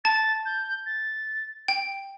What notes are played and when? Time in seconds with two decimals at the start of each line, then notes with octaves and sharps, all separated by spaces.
0.04 A5 A6
0.46 G6
0.86 A6
1.68 G5